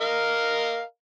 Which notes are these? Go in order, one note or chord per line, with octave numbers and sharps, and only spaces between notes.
A#4 D#5 F5